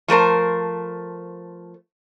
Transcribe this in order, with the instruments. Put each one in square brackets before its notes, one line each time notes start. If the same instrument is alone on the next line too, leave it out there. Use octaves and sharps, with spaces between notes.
[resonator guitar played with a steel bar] F3 A3 A#4 C5